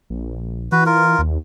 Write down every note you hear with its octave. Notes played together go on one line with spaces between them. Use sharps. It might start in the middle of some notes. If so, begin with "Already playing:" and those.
A#1
E3 F#4 B4
F4 A#4
D#2